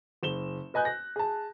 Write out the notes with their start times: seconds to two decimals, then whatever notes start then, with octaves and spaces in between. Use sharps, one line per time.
0.23 F#1 E7 G7
0.74 B4 D#5 G#5 F#6 G6
0.85 A#6
1.16 G#4 A5